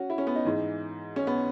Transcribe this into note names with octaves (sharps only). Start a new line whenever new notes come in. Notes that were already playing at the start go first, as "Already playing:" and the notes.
Already playing: C#4 F#4
E4
C#4
B3
D#4
G#2 E3
C#4
B3